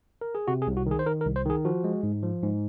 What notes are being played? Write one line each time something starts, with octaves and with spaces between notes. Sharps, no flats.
A#4
G#4
C3 F#4
G#4
C2
F#4
D#3 G#4
C5
D#3 A#4
A#4
C2
C5
D#3 G#4
F3 F#4
G#3
G#2
F3
G#2